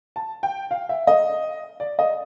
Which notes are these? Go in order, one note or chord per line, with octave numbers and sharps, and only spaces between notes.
A5
G5
F5
E5
D#5
D5
D#5